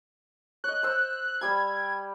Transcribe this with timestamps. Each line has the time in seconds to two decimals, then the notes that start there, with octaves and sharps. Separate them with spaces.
0.64 C#5 D#5 F#6
0.83 C5 E6
1.41 G3 G4 B5 G#6